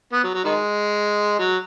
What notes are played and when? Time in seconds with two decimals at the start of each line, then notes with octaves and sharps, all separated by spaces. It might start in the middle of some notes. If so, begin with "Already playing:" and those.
0.13 B3
0.23 F#3
0.34 F#3
0.44 D#3 G#3
1.39 F#3